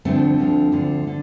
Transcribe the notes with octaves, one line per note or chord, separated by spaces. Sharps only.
D2 D3 F3 A3 C4
D2 D3 F3
D2 D3 F3
D3